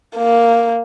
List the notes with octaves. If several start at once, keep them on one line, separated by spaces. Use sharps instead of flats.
A#3